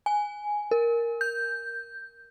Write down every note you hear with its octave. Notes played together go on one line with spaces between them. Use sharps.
G#5
A#4
G6